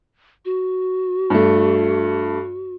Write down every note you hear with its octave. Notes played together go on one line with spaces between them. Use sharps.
F#4
G2 A3